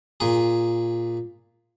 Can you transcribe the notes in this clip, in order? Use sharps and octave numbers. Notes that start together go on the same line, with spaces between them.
A#2 G#4